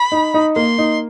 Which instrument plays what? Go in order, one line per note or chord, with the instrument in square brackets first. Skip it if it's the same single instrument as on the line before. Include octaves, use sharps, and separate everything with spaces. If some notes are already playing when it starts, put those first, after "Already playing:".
Already playing: [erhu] B5
[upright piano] D#4
D#4
[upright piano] A#3 [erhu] C6
[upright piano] D#4